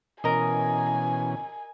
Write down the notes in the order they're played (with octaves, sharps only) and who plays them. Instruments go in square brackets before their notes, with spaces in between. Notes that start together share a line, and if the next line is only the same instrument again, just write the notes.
[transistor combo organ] B2 E3 C#4 [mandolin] A#4 D#5 [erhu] G#5